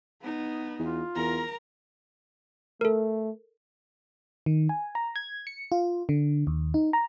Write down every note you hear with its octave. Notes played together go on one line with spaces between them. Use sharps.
B3 D#4
E2 F4
E2 A#4 A#5
A3 A4 A#4
D#3
G#5
A#5
G#6
C#7
F4
D3
D#2
D#4
A#5